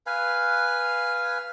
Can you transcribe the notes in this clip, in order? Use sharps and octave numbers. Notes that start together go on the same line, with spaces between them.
B4 F5 G#5